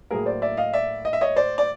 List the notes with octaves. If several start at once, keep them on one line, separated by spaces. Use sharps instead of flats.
A2 F#3 A#3 G#4 A#4
C5 D5
D5 E5
D#5 F5
D5 E5
D#5
E5
C#5 D#5
C5 D5
D5